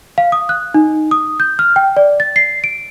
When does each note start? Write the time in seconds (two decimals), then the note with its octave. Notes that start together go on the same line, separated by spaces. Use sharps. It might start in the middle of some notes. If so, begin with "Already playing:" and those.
0.18 F5
0.32 D#6
0.49 F#6
0.74 D#4
1.11 D#6
1.40 G6
1.59 F6
1.76 G5
1.97 D5
2.20 A6
2.36 C7
2.64 D7